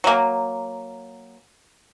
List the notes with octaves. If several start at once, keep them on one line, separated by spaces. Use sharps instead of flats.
F#3 A#3